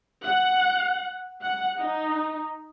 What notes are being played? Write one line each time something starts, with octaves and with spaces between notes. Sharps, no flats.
F#5
F#5
D#4